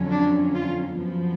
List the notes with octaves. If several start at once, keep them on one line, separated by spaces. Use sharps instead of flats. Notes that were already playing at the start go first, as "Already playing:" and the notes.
Already playing: F2 D3 F#3 C#4
D4
F4
F#2 F3 B3